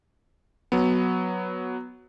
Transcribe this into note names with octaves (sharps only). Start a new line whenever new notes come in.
F#3 B3